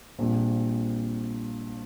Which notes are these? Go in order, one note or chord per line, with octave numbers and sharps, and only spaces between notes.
A#1 A#2 G3 C4